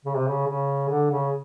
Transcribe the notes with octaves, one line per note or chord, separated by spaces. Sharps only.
C#3
C3
C#3
C#3
D3
C#3